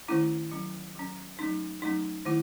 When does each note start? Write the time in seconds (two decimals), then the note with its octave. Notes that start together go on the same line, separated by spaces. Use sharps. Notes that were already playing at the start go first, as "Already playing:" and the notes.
0.08 D#3 A3 C#4 E4
0.52 F#3 C#4
0.95 F#3 C#4
1.39 F#3 A3 C#4 D#4
1.82 F#3 A3 C#4 D#4
2.25 D#3 A3 E4